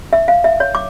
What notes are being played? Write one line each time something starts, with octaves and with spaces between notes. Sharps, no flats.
E5
F5
E5
C#5
D6